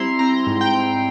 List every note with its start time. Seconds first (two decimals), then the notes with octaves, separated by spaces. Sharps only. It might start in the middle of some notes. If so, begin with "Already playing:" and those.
Already playing: G3 C4 E4 A#5 C6
0.19 C4 A#5
0.47 G#2
0.61 G5
0.75 G#2